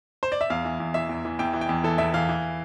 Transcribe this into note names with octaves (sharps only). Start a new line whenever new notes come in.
C5
D5
E5
E2 F5
E3
E2
E3 E5
E2
E3
E2 G5
E3
G5
E2
E3 A4
E2 E5
E3 F5
E3